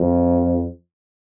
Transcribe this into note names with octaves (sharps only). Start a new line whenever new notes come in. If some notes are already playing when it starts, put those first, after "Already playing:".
Already playing: F2